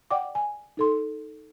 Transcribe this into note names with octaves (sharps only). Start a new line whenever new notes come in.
D5 F#5 G5 D6
G#5
D#4 A4 C6